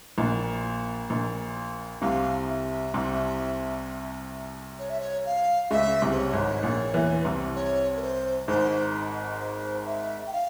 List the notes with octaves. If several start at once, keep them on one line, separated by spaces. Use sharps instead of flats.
A#1 A#2
A#1 A#2
C2 C3 F5
E5
C2 C3
C#5
E5
C#5
F5
C#2 C#3 E5
C2 C3
C5
C#5
G#1 G#2
A#1 A#2
E2 E3
C2 C3
C#5
A#4
C5
G#1 G#2 C5
C5
E5
G5
F5